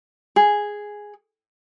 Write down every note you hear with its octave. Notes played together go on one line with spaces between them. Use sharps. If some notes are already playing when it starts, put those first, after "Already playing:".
G#4